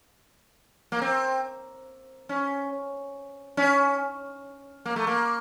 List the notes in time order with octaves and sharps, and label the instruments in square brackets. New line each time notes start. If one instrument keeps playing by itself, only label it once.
[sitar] A#3
C4
C#4
C#4
A#3
A3
A#3